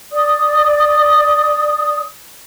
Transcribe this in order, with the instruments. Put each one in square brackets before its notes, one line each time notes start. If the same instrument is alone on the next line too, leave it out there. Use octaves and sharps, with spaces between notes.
[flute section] D5 D#6